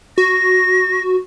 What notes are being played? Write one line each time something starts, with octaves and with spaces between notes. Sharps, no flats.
F#4 A#6